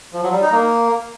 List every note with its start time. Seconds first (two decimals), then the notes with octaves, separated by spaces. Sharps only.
0.13 F3
0.23 F#3
0.32 G3
0.42 D#4
0.52 A#3